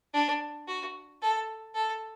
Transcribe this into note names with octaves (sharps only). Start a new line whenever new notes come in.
D4
F#4
A4
A4